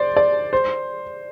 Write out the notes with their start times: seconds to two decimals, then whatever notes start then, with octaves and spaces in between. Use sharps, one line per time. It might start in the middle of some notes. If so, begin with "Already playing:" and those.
Already playing: C5 D5
0.17 D5
0.53 C5